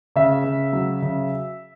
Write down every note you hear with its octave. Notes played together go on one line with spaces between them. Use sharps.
C#3 E5
C#3
F#3
C#3